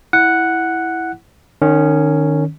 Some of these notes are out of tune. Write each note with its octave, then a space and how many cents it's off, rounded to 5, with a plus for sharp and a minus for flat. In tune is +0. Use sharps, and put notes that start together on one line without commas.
E4 +0 F#5 +0
D#3 -30 C#4 +0